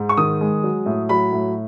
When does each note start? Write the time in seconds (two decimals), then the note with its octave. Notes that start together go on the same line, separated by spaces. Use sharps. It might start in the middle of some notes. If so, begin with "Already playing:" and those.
Already playing: G#2
0.09 C#6
0.17 D#3 D#6
0.41 G#3
0.63 F#3
0.86 A2
1.09 F#3 B5
1.32 A2